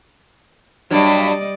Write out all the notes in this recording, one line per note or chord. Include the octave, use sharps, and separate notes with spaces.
G2 F#3 G3 D5 D#5